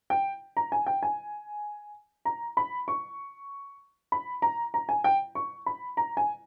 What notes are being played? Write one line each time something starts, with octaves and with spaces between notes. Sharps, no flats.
G5
A#5
G#5
G5
G#5
A#5
B5
C#6
B5
A#5
A#5
G#5
G5
C#6
B5
A#5
G#5